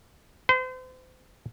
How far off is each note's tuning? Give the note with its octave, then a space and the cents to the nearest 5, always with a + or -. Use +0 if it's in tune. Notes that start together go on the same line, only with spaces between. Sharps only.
C5 -35